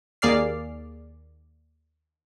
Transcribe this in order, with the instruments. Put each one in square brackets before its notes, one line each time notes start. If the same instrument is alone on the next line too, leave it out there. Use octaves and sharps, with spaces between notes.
[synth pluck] D#2 A#3 G#4 D5 F6 C7